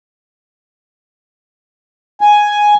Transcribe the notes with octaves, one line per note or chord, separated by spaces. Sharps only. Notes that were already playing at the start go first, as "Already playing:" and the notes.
G#5